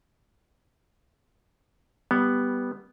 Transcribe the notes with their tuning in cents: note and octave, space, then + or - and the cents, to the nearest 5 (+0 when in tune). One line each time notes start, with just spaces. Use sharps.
G3 +0 B3 +0